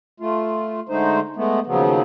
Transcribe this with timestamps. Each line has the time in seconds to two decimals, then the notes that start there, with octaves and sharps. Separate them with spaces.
0.20 A3 F4
0.89 D3 G#3 A3 D#4 C5
1.36 G#3 A3 B3
1.67 D#2 C#3 F3 F#3 B3